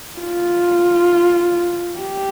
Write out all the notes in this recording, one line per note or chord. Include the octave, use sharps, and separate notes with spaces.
F4
G4